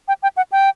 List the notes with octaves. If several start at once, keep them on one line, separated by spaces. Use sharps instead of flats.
G5
G5
F#5
G5